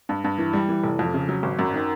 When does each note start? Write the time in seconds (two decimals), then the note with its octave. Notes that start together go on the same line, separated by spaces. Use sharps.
0.09 G2
0.24 G2
0.38 E3
0.53 G3
0.69 E3
0.84 F1
0.99 F2
1.14 C#3
1.29 F#3
1.43 G#1
1.59 F#2
1.74 D#3